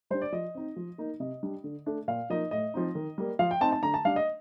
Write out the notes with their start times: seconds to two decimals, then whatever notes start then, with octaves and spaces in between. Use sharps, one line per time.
0.10 G3 D4 C5
0.22 D5
0.32 F3 D#5
0.55 C4 D#4
0.76 F3
0.98 A#3 D#4
1.20 C3 D#5
1.43 G3 D4
1.64 D3
1.86 A3 D4
2.08 A#2 F5
2.30 F3 A#3 D#4 D#5
2.51 A2 D#5
2.74 F3 C4 D#4
2.95 D#3
3.18 G3 A#3
3.39 F3 F5
3.51 G5
3.61 C4 D#4 A5
3.72 A5
3.83 D3 A#5
3.94 A5
4.05 G3 D4 F5
4.16 D#5